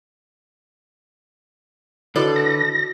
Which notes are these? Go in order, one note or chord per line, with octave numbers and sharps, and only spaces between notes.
D3 E4 F#4 A4 B4 D5
A#6